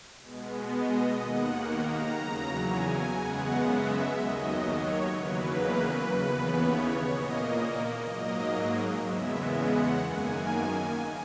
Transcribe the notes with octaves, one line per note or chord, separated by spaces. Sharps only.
B2 G#3 B3
D#5
D#2 D#3 A#3 F#5
A#5
E2 C#3 F#3
G#5
F#2 C#3 G#3 B3 F#5
E5
D#2 D#3 F#3 D#5
C#5
E2 C#3 F#3 A#3 B4
D#2 C#3 E3 B3
C#5
A#2 A#3 D#5
G#2 F#3 A#3 D#5
E2 C#3 G#3 B3 E5
F#5
F#2 D#3 A#3 G#5